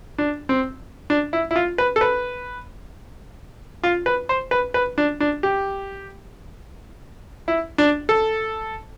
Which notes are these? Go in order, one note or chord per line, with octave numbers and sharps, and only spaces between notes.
D4
C4
D4
E4
E4
F4
B4
A4
B4
F4
B4
C5
B4
B4
D4
D4
G4
E4
D4
A4